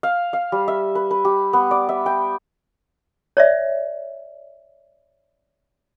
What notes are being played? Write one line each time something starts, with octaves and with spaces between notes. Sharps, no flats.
F5
F5
G3
E5
B4
B4
G4
B3
D5
E5
G5
C#5 D5 E5